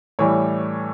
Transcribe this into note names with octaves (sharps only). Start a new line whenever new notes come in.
A2 E3 G3 C#5